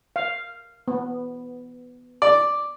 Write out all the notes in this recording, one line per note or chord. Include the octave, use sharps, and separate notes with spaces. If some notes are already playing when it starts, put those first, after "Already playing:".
F5
B3
D5